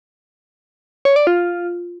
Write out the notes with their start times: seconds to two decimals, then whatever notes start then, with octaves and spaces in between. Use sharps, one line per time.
1.05 C#5
1.16 D5
1.27 F4